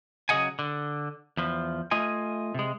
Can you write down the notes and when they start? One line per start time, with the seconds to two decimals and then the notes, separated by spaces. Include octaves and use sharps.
0.29 C#3 F#3 G#4 D#5 F#5 G#5
0.59 D3
1.37 E2 F3
1.91 A3 F4 D#5 G#5
2.54 C3 G#3